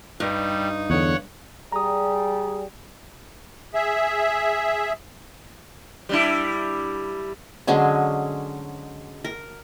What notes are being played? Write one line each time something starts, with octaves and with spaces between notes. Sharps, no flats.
G2 G3 D#4
E2 D3 C#5 F#5
G3 G#4 A#5 D#6
G#4 E5
G3 D4 E4
D3 F#3 G#3 C#4
A#4